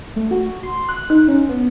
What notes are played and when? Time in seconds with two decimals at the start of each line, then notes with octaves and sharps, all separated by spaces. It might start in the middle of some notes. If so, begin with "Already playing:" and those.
0.16 A3
0.31 F#4
0.63 C6
0.89 F#6
1.10 D#4
1.28 C#4
1.49 B3